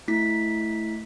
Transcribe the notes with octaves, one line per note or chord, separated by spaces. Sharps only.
A3 E4 B6